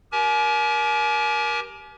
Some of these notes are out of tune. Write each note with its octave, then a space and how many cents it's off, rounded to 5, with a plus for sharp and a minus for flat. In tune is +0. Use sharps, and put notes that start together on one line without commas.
G4 +0 A#4 +25 G#5 +40